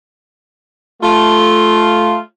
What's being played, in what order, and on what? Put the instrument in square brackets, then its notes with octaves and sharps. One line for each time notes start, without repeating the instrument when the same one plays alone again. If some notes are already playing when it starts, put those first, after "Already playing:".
[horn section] A3 F4